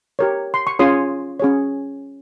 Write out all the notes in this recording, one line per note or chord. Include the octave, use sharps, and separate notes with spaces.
G4 A#4 C#5
C6
C#6
C#4 F4 G#4 C#5 C6 D#6
C#4 G#4 C#5